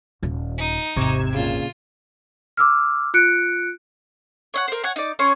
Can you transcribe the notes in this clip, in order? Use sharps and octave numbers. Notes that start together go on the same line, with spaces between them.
D#1 D#2
D#4
G#1 E2 C3 A#5 C#6 D6 G#6 E7
A#2 C#3 F4
D6 E6 F6
F4 F#6 C#7 D7
C#5 D#5 F#5
A#4 C5
C#5 F#5 G#5 F#6
D#4 D5
C#4 C#5 C6 C#6